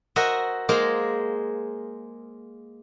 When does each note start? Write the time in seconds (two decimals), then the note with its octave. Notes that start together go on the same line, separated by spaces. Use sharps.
0.16 F#4 A#4 C5 D#5 E5 F#5
0.69 G#3 A#3 G#4 A#4 C5 F5